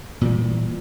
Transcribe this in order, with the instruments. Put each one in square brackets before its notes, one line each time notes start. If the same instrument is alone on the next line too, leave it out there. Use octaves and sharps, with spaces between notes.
[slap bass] A#2 E3 G3